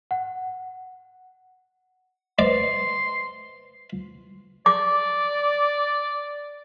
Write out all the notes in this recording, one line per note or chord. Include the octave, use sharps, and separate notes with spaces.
F#5
B4 C5 D5 C6
D5 D6